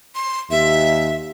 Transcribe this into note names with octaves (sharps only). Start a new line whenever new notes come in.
C6
D#2 E5